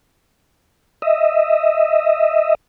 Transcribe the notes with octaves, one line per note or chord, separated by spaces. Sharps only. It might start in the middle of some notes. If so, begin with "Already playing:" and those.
D#5 E5